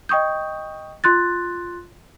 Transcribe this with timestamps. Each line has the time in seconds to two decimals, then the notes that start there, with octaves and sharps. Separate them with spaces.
0.09 D#5 G5 C#6 D#6 G6
1.04 F4 C6 F#6 A6